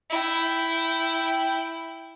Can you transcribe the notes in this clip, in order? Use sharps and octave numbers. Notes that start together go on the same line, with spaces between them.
E4 G5